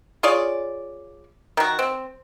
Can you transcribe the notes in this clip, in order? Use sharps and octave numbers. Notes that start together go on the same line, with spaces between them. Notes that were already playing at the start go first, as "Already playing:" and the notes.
F4 G#4 C#5 D5
D#3 F#4
C4